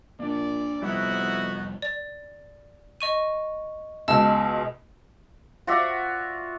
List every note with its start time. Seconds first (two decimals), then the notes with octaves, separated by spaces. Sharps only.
0.20 A#2 A#3 D4 D5
0.82 F1 F2 G3 B3 D#4 E4 F#4
1.82 D5
3.00 D#5 C#6 D#7
4.08 C#2 B2 D#5 A5 E6
5.67 F4 F#4 D5 E5